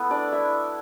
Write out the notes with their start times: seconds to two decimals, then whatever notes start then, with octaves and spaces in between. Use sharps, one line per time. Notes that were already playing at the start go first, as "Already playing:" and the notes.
Already playing: A3 B3 E4 A4 B4
0.11 D4 D5
0.32 E4 E5